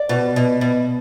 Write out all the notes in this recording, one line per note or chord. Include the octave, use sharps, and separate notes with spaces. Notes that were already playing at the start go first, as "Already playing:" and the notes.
Already playing: D5
B2
B2
B2